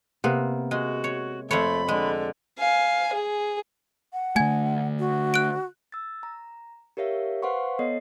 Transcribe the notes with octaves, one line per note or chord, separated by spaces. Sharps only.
C3 A#3 B3
G#3 F#4
C#5
F2 A3 C5 C#5 B5
D3 G#3
F5 G#5
G#4
F#5
D3 A3 G#5 G#6
F#4
F#6 D7
E6 A6
A#5
G4 A#4 C#5 E5 F5
B4 C5 F5 F#5 C6 C#6
B3 A4 C#5 D#5 C7